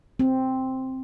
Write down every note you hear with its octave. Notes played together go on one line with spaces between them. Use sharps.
C4